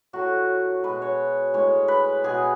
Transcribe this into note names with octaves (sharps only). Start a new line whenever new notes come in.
A2 F#3 A3 F#4
B2 G#3 B4
C#5
A2 G#3 C#5
B4
B2 G#3 G#4